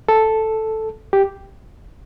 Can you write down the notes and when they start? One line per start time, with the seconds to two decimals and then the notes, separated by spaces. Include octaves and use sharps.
0.09 A4
1.13 G4